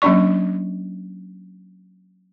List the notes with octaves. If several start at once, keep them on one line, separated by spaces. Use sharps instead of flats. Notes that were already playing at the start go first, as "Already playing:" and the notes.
F#3 A#3 C#4 D4 D5 C#6